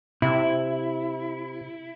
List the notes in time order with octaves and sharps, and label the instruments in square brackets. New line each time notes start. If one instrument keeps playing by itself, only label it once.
[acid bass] C3 [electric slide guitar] E4